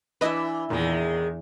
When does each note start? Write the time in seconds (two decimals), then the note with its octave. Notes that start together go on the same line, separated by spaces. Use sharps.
0.21 E3 D4 E4 B4 D#5 E5
0.70 E2 A#2 D#3 G#3